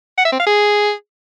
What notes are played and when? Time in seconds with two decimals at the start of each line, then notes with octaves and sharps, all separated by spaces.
0.18 F#5
0.25 E5
0.32 C4
0.40 F5
0.47 G#4